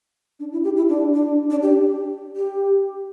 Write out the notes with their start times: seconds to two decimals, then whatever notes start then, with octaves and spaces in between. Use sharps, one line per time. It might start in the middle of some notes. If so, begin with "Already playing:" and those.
0.40 D4
0.52 E4
0.64 G4
0.76 E4
0.89 D4
1.14 D4
1.50 D4
1.62 G4
2.37 G4